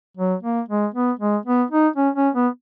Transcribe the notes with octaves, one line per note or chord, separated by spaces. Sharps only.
F#3
A#3
G#3
B3
G#3
B3
D#4
C#4
C#4
B3